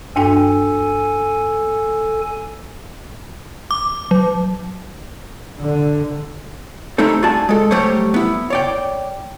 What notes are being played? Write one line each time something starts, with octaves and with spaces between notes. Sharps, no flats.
G2 D4 A4 G5 G#5
D6
F#3
D3
G3 A3 C4 D#4 A4
F4 F#4 G#4 D5 A5
G#3 A4
F#3 G3 A3 G4 C5 C#5
B3 E4
C#5 D5 G5